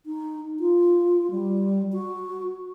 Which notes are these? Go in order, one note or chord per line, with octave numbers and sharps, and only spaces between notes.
D#4
F4
G3
F#4